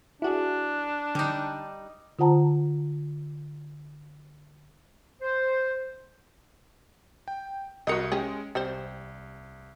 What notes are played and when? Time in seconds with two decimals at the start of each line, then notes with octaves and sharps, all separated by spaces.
0.22 D4 E4 F#4 G#4
1.15 D3 G3 D#4
2.19 D3 F4 C5 F#5 A5 A#5
5.21 C5
7.28 G5
7.87 C2 F#4 A#4 D#5 D#6 C#7
8.12 G#3 C#4 G4 G#4
8.55 C2 G3 C4 C5